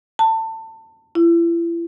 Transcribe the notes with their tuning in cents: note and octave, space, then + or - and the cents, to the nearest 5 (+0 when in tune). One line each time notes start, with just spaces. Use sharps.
A5 +25
E4 +40